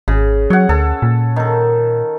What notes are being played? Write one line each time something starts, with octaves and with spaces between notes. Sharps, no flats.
G#1 C#3
F#3 C#5 F#5
D2 A4
A#2
D#3 A4